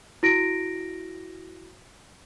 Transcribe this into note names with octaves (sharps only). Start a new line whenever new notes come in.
E4 F#4 A#6 D7